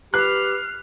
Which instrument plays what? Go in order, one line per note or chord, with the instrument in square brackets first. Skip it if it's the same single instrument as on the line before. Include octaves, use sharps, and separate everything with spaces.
[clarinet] G4 [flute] B4 [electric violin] F6 C7 [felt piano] F#6